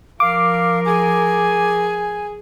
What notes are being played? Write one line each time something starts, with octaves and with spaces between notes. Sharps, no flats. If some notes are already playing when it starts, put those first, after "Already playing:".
F3 A#4 F5 D6
G#4 G#5